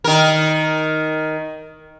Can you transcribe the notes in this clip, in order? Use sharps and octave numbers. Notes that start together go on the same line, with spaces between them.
D#3 A#4